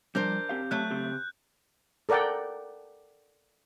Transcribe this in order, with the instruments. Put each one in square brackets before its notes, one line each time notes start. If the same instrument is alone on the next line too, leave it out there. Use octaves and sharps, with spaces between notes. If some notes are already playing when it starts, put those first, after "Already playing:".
[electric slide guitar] F3 G3 [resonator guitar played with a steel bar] D4 A#4 C5 [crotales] G6
[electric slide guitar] C4 G4 F5
[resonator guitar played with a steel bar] F#3 A3 [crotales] F#6
[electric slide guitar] C#3 C4 G4
[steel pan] A4 A#4 D5 F#5 G5